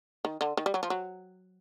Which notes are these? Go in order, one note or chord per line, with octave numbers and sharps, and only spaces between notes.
D#3
D3
D#3
G3
F#3
F3
F#3